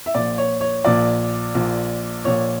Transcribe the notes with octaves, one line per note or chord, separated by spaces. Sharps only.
E5
A#1 A#2 D5
C#5
C#5
A#1 A#2 D5
A#1 A#2
A#1 A#2 C#5